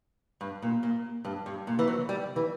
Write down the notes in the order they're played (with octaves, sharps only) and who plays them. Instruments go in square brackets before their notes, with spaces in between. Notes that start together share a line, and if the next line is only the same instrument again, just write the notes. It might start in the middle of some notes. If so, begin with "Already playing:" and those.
[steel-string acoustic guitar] G2
A#2
A#2
G2
G2
A#2
E3
F#3
G3
E3